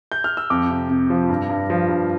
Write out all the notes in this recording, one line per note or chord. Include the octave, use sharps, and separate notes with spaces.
G6
F6
E6
F2 D6
C3
C3
F3
G2
G2
F3
G2